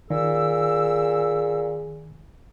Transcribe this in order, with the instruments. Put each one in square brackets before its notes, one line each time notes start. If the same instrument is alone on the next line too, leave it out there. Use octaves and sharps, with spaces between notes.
[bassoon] A#2 [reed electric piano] D#3 [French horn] G#4 [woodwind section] E6